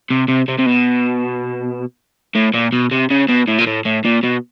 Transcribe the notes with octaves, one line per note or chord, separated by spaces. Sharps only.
C3
C3
C3
C3
B2
A2
A#2
B2
C3
C#3
B2
A2
A#2
A2
A2
A#2
B2